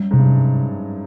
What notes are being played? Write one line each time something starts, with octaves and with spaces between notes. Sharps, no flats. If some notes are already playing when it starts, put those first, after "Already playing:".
Already playing: F#2 G3
G#2
C3
G2
F#2